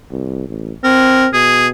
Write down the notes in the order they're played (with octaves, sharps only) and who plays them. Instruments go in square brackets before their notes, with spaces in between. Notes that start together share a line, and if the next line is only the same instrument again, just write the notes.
[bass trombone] C2
A1
[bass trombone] C4 [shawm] A#4
[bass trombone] B2 [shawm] G#4